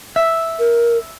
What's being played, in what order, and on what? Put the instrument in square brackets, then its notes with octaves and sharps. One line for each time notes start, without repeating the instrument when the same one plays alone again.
[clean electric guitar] E5
[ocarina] A#4